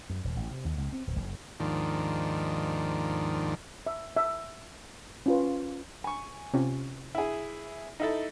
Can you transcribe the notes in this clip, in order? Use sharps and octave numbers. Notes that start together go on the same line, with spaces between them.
F#2
D#1
A1
C3
D#2
C#2
C4
D1
F#1
D#2 G#2 D#3 F3 D4
E5
E5
C#4 F4 B4
G#5 C#6
C3 C#4 F4
E4 G#4
D#4 E4 A4